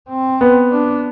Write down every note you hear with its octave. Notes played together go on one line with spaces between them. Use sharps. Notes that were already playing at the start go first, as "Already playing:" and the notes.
C4
B3
D4